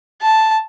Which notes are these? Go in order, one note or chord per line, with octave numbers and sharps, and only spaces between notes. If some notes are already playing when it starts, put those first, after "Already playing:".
A5